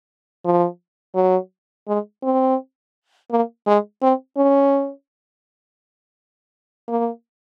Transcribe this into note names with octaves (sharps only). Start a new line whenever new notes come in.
F3
F#3
G#3
C4
A#3
G#3
C4
C#4
A#3